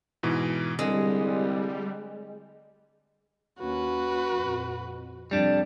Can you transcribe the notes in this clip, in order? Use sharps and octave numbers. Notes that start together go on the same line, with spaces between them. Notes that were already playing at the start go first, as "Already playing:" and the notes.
G#2 B2 E3
C2 D3 G3 G#3
D#2 A#3 C#4 F#4 B4
F2 A#2
F2 C3 G3 D4